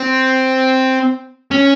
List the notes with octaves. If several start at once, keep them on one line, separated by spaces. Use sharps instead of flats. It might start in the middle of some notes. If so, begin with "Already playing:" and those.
Already playing: C4
C#4